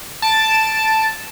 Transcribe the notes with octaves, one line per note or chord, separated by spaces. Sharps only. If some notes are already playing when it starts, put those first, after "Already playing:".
A5 A6 D7